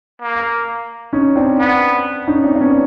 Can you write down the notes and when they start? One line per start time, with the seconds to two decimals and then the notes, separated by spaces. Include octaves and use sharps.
0.22 A#3
1.13 C#4 D#4
1.36 C4 D4
1.59 B3
2.27 C#4 D#4
2.44 C4 D4
2.55 D4
2.61 B3 C#4